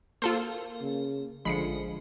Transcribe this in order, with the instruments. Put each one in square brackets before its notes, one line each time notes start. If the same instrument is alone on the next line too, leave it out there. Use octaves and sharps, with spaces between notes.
[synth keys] A#3 [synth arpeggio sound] F4 A4 C5 [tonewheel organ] A#4 F5
[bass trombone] C#3
[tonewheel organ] A1 D#5 [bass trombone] D3 [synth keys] F3 G#3 [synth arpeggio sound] B5 C7 C#7